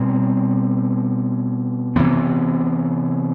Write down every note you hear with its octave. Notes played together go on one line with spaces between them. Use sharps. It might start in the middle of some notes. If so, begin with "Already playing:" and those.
Already playing: B2 G3 C4
C3 E3 B3